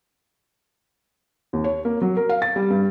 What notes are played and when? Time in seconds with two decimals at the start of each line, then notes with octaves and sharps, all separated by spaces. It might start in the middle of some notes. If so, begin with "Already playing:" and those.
1.53 D#2
1.64 C#5
1.85 A#3
2.02 F#3
2.17 A#4
2.29 F5
2.42 A6
2.56 G3
2.70 G2